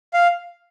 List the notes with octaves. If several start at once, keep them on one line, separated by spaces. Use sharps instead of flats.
F5